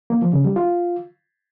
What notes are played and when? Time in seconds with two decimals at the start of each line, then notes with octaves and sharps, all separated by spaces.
0.10 A#3
0.22 F3
0.33 C#3
0.45 G3
0.56 F4